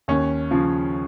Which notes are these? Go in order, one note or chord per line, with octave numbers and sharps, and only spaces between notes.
D#2 C#4
C#3 F3